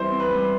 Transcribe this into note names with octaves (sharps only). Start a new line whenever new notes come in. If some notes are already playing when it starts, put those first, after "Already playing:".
Already playing: E3 G3 C4 E4 C5
C4
B4
G3